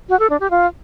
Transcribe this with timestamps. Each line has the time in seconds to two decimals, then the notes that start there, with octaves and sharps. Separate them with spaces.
0.09 F#4
0.19 A4
0.30 D4
0.40 G4
0.51 F4